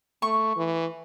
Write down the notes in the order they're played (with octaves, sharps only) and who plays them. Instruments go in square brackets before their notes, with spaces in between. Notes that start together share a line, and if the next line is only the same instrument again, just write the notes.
[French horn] A3 [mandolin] C#6
[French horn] E3